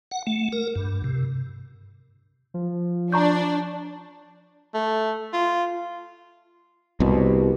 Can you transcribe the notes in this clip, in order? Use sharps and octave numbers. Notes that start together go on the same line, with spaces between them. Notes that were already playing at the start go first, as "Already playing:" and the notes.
F#5
A3
A#4
G2
C3
F3
D4 A#5 C#6 G6
A3
F4
C2 B2